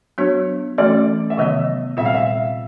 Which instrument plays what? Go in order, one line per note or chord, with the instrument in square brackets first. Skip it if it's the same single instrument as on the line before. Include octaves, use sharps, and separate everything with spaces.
[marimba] F#3 B3 D4 F#4 [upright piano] C#5
[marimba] E3 A3 C#4 F#4 A4 [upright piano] D5
[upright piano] E5
[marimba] C3 D#3 F#3 B3 [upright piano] D#5
[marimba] A#2 G3 C4 F4 [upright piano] E5
[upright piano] F5
E5